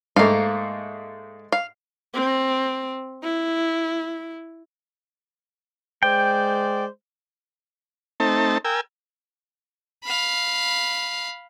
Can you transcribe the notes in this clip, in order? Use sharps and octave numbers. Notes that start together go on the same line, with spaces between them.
G#2 A3 A#3 F5
F5
C4
E4
G#3 C5 D5 G5
A3 C4 D#4 A5
A#4 G5 G#5 E6
F5 B5